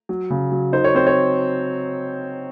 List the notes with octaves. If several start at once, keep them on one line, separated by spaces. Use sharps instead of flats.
F#3
C#3
F#3
D#4 C5
C#5
C4 C5
C#5